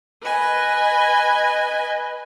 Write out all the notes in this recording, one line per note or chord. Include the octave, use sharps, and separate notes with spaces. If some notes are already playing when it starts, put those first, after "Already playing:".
B4 D#5 G#5